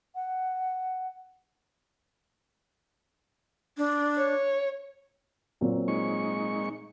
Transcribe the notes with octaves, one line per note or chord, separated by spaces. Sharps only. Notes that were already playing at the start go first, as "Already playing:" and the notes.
F#5
D4
C#5
A#2 F#3 C4
G#3 D#4 C#6